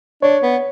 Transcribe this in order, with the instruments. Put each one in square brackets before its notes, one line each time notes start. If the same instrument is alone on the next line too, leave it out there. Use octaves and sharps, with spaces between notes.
[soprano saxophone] D4 [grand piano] C#5
[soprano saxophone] B3